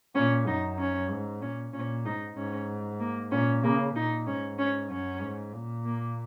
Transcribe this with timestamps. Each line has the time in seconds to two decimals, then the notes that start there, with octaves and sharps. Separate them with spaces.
0.15 A#2 C#4
0.47 F#2 D#4
0.79 C#4
1.11 G#2
1.41 A#2 C#4
1.73 A#2 C#4
2.05 G#2 D#4
2.37 G#2 C#4
3.00 A#3
3.31 A#2 C#4
3.63 C#3 A#3
3.95 A#2 D#4
4.27 G#2 C#4
4.59 C#4
4.90 F#2 C#4
5.21 G#2
5.53 A#2
5.85 A#3